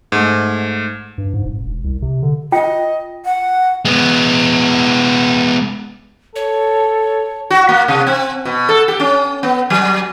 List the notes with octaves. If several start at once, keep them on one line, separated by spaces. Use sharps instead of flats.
G#2 A3
G2
G#2
D#1
E1
C2
C3
D3
F4 D#5 G5
F#5
G#3 B3
A4 C#5
F#4
A#3
C3
C4
B2
A4
G4
C#4
B3
F#3